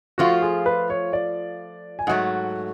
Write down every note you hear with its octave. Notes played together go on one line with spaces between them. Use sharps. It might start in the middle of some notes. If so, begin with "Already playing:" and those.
F3 A3 F4 F#4
G#4
B4
C#5
D5
G#5
G#2 F#3 A3 F#5